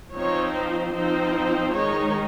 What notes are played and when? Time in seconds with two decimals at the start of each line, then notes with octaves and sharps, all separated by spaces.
0.15 F3 C4 D#4 C#5
0.54 C5
0.95 F3 C4 D#4 C5
1.75 D#3 G#3 D#4 C#5